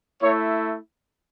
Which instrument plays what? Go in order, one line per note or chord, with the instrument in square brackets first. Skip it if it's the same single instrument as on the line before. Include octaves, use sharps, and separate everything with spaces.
[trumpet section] A3 E4 C#5